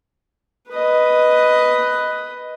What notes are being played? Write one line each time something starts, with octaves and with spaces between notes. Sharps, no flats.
B4 D#5